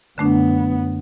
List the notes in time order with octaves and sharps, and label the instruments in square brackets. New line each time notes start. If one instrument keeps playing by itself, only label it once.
[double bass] F#2 B3 [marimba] D3 A3 D4